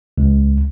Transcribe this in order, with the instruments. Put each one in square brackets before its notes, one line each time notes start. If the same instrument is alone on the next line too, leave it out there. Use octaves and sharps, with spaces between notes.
[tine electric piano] C#2